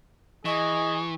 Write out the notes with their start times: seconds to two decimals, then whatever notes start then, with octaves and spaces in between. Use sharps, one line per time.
0.45 E3 G#4 D#5 C#6